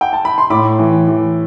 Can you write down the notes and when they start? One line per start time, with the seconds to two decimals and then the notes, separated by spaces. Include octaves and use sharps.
0.01 G5
0.13 A5
0.25 B5
0.38 C6
0.50 A2 B5 D6
0.79 E3
1.08 E3